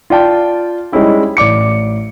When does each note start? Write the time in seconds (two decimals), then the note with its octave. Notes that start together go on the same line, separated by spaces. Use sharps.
0.10 F4 D5 G5 A5
0.92 G3 G#3 C#4 D#4 E4 G4
1.37 A1 D5 D6 C#7